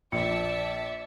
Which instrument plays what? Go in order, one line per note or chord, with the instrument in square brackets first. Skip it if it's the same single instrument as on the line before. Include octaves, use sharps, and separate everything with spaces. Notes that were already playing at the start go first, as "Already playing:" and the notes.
[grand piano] A#1 [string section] D5 E5 A5 [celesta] C#7